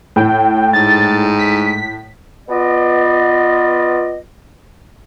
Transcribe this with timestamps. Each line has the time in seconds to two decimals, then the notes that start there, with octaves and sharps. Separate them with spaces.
0.16 A2 G5
0.73 G#2 A6
1.39 B6
2.49 B3 F4 D5 D#5